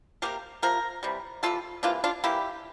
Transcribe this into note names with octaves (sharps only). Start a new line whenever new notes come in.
C3 F3 A#3 G4 A#4
C3 F3 A#3 A#4
C3 E3 G3
C3 E3 G3 F4 A4
C3 E3 A#3 D4 F4
D4 F4
C3 E3 A#3 E4 G4